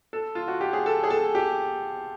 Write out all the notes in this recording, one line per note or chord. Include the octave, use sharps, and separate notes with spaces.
A4
F4
F#4
G4
G#4
A4
G#4
A4
G4